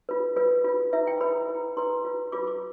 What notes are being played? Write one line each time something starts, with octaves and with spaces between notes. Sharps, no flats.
F4 B4
F4 B4
F4 B4
E4 B4 E5
G5
E4 B4 B5
E4 B4
E4 B4 C6
F4 B4
F4 B4 D6
D6